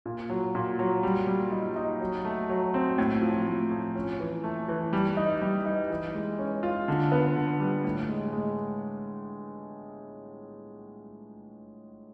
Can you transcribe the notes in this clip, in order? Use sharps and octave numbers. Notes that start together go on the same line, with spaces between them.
A#2
F#3
A#2
F#3
G3
G3
D#4
D#4
F#3
A3
F#3
C4
A2
F3
A2
F3
C#4
E3
A3
E3
G3
D#4
G3
D#4
E3
G#3
C#4
F4
D3
B3
D3
G3
A2
G#3
G#3